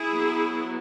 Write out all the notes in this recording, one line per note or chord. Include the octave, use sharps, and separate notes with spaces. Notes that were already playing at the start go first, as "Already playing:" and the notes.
Already playing: E4 G#4
F#3 B3